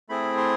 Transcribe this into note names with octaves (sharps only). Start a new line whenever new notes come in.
A3 C4 E4 G#4 B5
C6